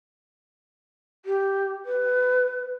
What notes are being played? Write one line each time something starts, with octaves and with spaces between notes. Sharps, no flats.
G4
B4